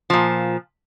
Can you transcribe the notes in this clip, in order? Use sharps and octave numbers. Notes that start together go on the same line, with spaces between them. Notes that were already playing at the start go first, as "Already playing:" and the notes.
A#2 F3